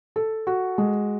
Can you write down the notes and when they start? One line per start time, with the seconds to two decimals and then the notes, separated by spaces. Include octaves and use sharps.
0.16 A4
0.47 F#4
0.78 G#3